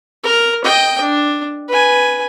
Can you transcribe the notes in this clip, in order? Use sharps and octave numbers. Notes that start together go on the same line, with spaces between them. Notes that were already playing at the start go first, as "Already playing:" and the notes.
A#4
D#5 G5
D4
B4 G#5